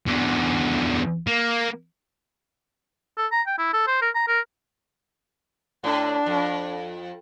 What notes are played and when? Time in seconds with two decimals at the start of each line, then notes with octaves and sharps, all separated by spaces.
0.06 E2 D3
1.27 A#3
3.18 A4
3.32 A#5
3.47 G5
3.58 E4
3.73 A4
3.87 C5
4.02 A#4
4.15 A#5
4.28 A#4
5.84 A2 D4
6.26 F2